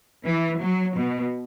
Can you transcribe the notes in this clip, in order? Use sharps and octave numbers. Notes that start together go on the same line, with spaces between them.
E3
F#3
B2